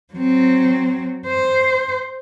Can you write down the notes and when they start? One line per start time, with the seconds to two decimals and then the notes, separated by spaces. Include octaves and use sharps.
0.14 F#3 C4
1.27 C5